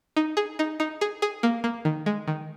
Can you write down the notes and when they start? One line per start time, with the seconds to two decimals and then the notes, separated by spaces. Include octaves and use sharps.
0.17 D#4
0.37 G#4
0.59 D#4
0.80 D#4
1.01 G#4
1.22 G#4
1.43 A#3
1.64 A#3
1.85 D#3
2.06 G#3
2.28 D#3